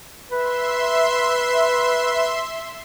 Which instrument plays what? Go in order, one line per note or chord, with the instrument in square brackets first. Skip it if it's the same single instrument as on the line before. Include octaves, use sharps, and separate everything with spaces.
[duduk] B4 [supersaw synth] E5 C6